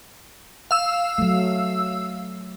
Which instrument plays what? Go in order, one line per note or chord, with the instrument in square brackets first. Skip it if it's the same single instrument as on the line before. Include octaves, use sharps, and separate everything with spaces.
[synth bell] F5 E6
[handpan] F#3 A3